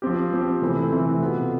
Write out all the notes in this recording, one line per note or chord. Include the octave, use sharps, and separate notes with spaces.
F3 C4 G4
F3 C4 G4
C3 E3 A3 C4 E4
C3 E3 A3 C4 E4
B2 B3 F4 A4